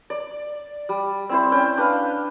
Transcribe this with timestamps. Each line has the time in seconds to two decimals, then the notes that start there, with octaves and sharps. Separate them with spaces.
0.10 D5
0.89 G3
1.29 C4 E4 C5
1.52 C#4 G5
1.77 D4 B4 F5